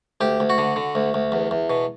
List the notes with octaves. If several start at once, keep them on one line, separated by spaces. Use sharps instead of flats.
D2 G4
D2
F#4
D3
D3
D2
D2
E2
E2
B2